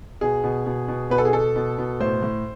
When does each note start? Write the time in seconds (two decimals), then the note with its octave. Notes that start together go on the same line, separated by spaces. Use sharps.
0.21 B2 G#4
0.44 B2
0.66 B2
0.88 B2
1.10 B2 B4
1.18 A4
1.25 G#4
1.33 B2 A4
1.56 B2
1.78 B2
2.00 A2 C5
2.23 A2